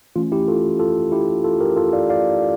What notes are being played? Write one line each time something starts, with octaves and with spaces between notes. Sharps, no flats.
E3 A3 C#4 F4
E4 G4
F4 A4
F4 A4
E4 G4
F4 A4
G4 A#4
F4 A4
D5 F5
D5 F5